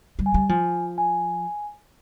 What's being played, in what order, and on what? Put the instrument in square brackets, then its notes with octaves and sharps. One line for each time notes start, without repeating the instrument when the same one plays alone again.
[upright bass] G3
[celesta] G#5
[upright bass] G3
[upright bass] F3 [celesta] G#5
[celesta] G#5